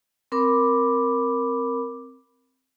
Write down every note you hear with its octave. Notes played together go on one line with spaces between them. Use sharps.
C4 A#4 B5 D6